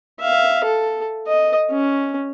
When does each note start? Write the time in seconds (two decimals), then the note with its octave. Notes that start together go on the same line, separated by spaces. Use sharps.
0.20 E5 F5
0.64 A4
1.27 D#5
1.70 C#4